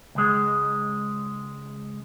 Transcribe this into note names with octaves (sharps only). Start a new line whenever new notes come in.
C#2 G#3